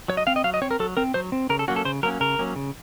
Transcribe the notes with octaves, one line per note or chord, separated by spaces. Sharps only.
F#3 C#5
D#5
C4 F5
D#5
F#3 F5
D#5
C4 C#5
A#4
F#3 A4
C4 A#4
F#3 C5
C4
C#3 A#4
A4
F#3 A#3 C#4 F#4
A4
C#3 C5
F#3 A#3 C#4 A#4
C#3 A#4
F#3 A#3 C#4
C#3